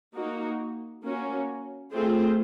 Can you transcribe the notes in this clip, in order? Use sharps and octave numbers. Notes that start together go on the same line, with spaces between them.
A#3 D#4 F#4
A#3 C#4 F#4
A3 C4 F4 G#4 C5